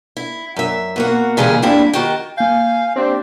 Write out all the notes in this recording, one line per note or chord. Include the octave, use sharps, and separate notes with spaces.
E4
F#2 E5
B2 A#3 F#4
A#2 C#3 E3 G#3 G4 G#4
G3 A#3 C4 D4 E4
D#3 F#4 G4
A#3 F5 G#5 G6
C4 D4 G4